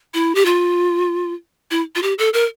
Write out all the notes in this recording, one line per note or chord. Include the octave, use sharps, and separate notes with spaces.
E4
G4
F4
E4
F4
G4
A4
A#4